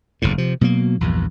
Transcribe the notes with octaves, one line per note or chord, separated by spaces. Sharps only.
F#1 E2 A2
C3 F3
B2 F#3 A3 A#3
A#1 E2 G2